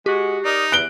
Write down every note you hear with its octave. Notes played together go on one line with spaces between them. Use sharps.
G#3 F#4 G4
D#4 A#4 D5 D#5
E2 F#6 D7 G7